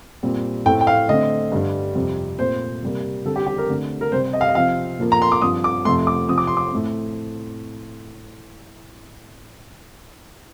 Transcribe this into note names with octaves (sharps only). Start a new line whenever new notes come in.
A#2 G3 C4
A2 A3 C4 G5
G5
F5
D3 A3 C4 D#5
G2 D3 G3
F2 C3 G3 C4
A#2 A3 C4 C5
C3 G3 A#3
D3 G3 C4 A4
G4
G4
A#4
D3 A3 C4
A#4
C3 G3 C4 C5
D#5
F5
D#5
C3 F3 C4 F5
A#2 F3 A#3
A#5
C6
D6
G2 F3 C4 D#6
D6
F2 C3 F3 A3 C6
D6
C3 F3 C4 D#6
D6
C6
D6
A2 A3 C4